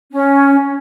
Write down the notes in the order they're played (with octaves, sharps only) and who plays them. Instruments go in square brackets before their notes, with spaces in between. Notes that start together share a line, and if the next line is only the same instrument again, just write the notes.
[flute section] C#4